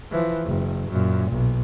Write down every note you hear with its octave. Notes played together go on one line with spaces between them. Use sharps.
E3 F3
F#1
F#2 A#2
B1